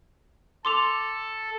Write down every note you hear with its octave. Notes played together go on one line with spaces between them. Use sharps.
A4 C6 D6 F7